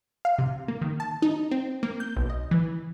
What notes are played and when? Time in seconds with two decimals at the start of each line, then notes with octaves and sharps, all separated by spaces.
0.25 F5
0.38 C3
0.68 A#3
0.81 D#3
1.00 A5
1.22 D#4
1.51 C4
1.83 A#3
2.00 G6
2.16 B1
2.30 D#5
2.51 E3